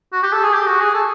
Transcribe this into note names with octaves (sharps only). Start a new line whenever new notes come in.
F#4
G4
A4
G#4
G4
F#4
G#4
A4